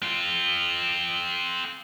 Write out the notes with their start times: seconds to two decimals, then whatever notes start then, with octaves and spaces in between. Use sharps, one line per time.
0.03 C4 F4